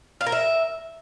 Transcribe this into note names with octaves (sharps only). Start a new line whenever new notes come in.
F5
A#4
E5